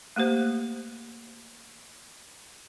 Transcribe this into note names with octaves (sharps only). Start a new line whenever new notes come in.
A3 A#3 G4 C5